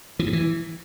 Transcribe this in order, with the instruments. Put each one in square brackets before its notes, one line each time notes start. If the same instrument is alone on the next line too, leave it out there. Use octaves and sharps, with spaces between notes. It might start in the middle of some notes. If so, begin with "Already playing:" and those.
[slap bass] E3
G2
E3